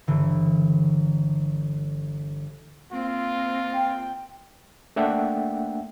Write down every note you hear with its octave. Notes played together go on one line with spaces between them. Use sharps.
G1 D3 E3
A#3 C4 F4
G5
A3 A#3 D4 E5 F#5 G5